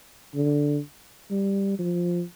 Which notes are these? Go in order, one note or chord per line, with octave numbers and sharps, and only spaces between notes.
D3
G3
F3